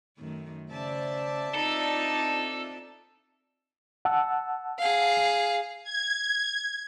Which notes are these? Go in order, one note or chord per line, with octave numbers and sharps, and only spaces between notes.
F#2 D#3 A3
C#3 C5 D5 E5 A5
C4 D4 D#4 F4 A4
F#5 A5 E6
G#4 F5
G#6